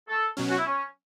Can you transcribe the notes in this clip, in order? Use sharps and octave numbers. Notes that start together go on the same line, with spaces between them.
A4
B2 F#3 C#4
F#4
E4
C#4